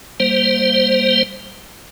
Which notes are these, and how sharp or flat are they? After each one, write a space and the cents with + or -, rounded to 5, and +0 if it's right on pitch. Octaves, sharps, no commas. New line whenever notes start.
G3 +0 A#3 +0 C5 +0